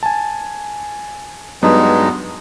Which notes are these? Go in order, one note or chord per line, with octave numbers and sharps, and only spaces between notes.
G#5 A5
G2 F#3 G#3 B3 D4 D#4